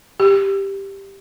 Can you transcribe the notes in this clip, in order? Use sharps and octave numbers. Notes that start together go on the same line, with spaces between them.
G4